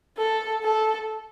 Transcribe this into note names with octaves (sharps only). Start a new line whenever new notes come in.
A4
A4